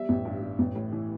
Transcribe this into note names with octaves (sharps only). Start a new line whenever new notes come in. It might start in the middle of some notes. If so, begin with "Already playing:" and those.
Already playing: E2 G3 E5
A1
G2
G3
A1
A2
E3